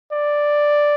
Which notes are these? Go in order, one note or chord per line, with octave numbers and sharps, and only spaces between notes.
D5